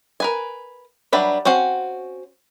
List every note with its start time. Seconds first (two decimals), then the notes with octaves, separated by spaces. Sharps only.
0.20 A#4 B4 G#5
1.13 F#3 G3 D4 B4 E5
1.45 C4 C#4 F#4 F5